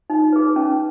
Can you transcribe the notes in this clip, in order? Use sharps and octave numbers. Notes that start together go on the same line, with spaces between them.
D#4
G#4 B4
C#4